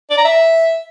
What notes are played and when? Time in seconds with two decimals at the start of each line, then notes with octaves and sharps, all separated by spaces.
0.11 D5
0.18 A#5
0.25 E5